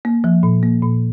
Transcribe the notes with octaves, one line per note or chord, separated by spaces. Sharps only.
A#3
F3
A#2
A#3
A#2